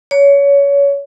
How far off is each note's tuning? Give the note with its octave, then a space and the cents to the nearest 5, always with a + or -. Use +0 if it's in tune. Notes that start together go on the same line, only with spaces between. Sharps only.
C#5 +25